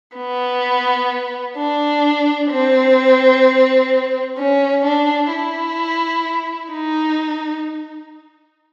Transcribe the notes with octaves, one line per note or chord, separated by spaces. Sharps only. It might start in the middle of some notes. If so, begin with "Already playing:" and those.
B3
D4
C4
C#4
D4
E4
D#4